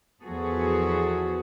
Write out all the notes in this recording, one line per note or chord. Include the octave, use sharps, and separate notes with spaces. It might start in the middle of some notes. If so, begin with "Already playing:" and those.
E2 F3 B3 F#4 G#4 A4